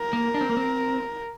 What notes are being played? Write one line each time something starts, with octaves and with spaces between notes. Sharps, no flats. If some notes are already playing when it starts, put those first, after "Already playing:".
Already playing: A#4
A#3
D4
C4
A#3
C4